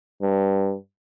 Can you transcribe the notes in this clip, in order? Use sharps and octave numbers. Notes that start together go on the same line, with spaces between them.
G2